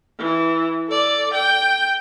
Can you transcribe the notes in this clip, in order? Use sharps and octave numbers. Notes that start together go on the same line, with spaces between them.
E3
A4 D5
G5